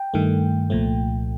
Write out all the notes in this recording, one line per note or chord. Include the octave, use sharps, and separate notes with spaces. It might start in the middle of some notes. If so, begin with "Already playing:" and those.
Already playing: G5
G2 D#3 A3
C2 A#2 F3 A3